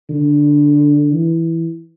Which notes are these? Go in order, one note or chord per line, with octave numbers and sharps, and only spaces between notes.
D3
E3